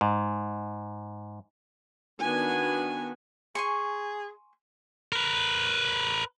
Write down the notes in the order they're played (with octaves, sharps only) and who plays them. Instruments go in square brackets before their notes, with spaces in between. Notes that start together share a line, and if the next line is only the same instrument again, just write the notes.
[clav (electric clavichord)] G#2
[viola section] D#3 B3 D4 F#4 G#5
[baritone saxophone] G#4 [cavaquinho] G#5 C6 C#6
[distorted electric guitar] A#4 B4